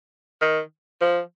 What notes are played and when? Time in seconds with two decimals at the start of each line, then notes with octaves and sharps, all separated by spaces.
0.41 D#3
1.01 F3